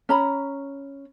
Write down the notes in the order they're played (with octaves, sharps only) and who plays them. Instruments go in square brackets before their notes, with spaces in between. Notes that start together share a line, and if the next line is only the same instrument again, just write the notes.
[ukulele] C#4 A#5 B5